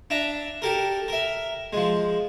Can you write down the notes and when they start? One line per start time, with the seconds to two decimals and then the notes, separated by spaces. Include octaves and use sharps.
0.10 D4 E5 A#5
0.62 G4 A4 A#4
1.08 A#4 E5
1.73 F3 G#3